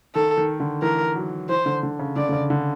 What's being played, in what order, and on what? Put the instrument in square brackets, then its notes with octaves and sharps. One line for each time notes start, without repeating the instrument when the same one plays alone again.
[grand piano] D#3 [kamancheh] A4
[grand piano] D#3
D3
[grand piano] E3 [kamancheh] A#4
[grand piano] F#3
[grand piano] E3 [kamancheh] C5
[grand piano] D3
D3
C#3
[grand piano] D3 [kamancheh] D5
[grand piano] D3
C#3
D3